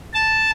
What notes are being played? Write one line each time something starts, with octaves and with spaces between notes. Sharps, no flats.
A5